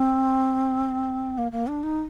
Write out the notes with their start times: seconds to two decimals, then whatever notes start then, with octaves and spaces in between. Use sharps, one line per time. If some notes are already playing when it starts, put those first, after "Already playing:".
Already playing: C4
1.38 A#3
1.52 A#3
1.67 D4
1.83 D#4